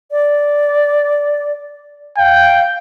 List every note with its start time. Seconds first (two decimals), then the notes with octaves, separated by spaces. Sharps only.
0.12 D5
2.18 F5 G5